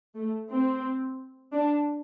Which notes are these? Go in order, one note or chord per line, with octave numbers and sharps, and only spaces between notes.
A3
C4
D4